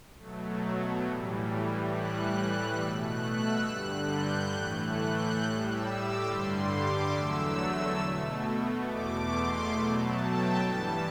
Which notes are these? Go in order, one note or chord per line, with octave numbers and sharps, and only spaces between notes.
B2 F#3 A3
A2 E3 G3
A2 E3 G3 F#6
B2 A3 E6
F#6
E6
G2 D3 G3 F#6
G6
A2 E3 A3 F#6
F#6
G6
A2 G3 F#6
E6
D6
G2 D3 G3 C6
D6
E2 D3 F#3 A3 E6
B2 A3
E2 B2 A3 D6
C6
B2 F#3 A3 B5
A5
G5
G2 E3 G3 A5